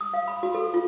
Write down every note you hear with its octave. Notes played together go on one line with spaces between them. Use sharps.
D#6
F5
B5
F#4
A4
F4